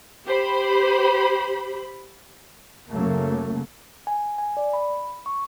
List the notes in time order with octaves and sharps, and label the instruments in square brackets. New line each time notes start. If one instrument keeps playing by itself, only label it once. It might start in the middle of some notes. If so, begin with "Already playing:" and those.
[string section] G4 C5 B5
[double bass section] F#2 C#3 F#3 A3 A#3
[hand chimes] G#5
G#5
D5
B5
C#6